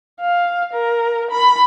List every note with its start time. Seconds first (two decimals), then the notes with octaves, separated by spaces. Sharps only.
0.20 F5
0.73 A#4
1.31 B5